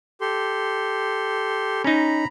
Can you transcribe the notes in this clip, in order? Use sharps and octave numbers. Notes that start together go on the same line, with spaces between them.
G4 A4 C6
C#4 D#4 A#5 B5